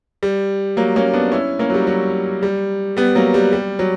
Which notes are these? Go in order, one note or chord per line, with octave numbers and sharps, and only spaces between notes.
G3
F#3 A#3
A#3 C#4
B3 D4
C#4 E4
A#3 C#4
F#3
G3
F#3
G3
G3 B3
F#3 A#3
G3
G3
F#3